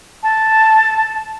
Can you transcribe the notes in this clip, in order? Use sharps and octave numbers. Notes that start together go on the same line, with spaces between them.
A5